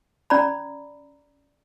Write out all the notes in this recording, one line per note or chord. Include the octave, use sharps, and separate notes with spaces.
C#4 D5 A#5 B5